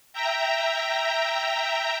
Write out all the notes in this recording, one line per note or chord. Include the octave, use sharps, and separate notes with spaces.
E5 G5 A#5